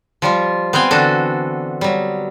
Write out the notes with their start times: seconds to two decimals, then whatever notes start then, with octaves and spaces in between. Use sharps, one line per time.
0.22 F3 G3 F4
0.73 B3 C4 F5 G5 G#5
0.91 D3 E3 D4 F#4 A4
1.81 F#3 G3